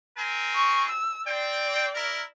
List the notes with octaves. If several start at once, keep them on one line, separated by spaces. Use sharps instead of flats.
C4 A#4 G#5
C#6
E6
C4 D5 G5
E4 A#4